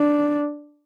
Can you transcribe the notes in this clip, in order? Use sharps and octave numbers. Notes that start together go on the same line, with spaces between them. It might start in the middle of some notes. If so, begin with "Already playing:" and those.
Already playing: D4